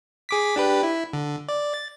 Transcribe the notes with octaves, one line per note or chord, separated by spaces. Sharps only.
G#4 D6 B6
D4 G4 B4
E4
D3
D5
A6